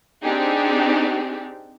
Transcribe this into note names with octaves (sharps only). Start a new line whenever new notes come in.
C4 D4 D#4 G4 G#4